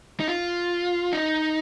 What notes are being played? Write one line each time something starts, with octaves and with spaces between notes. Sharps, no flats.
D#4
F4
D#4